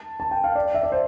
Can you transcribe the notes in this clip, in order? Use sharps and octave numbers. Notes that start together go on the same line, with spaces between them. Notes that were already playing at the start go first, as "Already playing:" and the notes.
Already playing: A5
A5
G5
F5
D5
E5
D5
C5